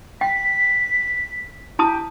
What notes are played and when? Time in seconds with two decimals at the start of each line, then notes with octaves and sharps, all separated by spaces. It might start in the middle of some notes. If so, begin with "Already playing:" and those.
0.21 G5 B6
1.79 E4 G4 A5 D#6